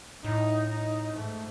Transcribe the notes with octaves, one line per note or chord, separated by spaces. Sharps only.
A2 D#4
D#4
G#2 A3